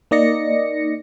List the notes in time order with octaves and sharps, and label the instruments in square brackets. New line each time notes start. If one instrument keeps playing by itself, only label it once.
[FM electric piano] A#3 D#4 D5 D#5 A#6 C#7